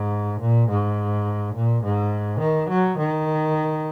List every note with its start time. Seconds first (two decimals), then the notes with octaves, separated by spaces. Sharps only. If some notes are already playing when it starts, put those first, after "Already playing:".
Already playing: G#2
0.41 A#2
0.69 G#2
1.55 A#2
1.84 G#2
2.40 D#3
2.69 F#3
2.98 D#3